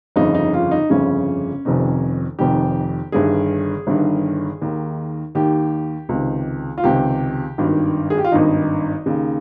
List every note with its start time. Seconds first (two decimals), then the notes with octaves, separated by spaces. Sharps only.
0.16 G1 F2 C#3 D#4
0.34 D#4
0.54 F4
0.71 D#4
0.90 G1 F2 C#3 C#4
1.65 F1 F2 C3 D#3
2.39 F1 F2 C3 D#3 G4
3.12 G1 G2 D#3 G#4
3.87 G1 G2 D#3
4.61 D#2 D#3
5.35 D#2 D#3 G4
6.09 C#2 C3 D#3
6.78 F4
6.83 C#2 C3 D#3 G4
7.58 G#1 G2 D#3
8.10 G#4
8.18 G4
8.24 F4
8.32 G#1 G2 D#3 D#4
9.06 D#2 C#3